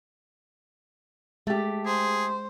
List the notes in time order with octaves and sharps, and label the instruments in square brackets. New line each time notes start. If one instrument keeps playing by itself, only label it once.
[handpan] G#3 [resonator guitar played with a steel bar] A3 G4
[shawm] G#4 [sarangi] C5